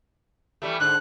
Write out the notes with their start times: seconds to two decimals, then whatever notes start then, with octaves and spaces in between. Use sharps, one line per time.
0.62 E3 G3 A3
0.80 G#2 D3 F#6